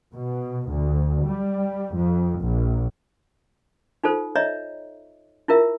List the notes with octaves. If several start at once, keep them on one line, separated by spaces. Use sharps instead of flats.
B2
D2
G3
F2
A#1
D#4 F4 A4 C5
C#5 D#5 E5 A#5
E4 F4 A#4 E5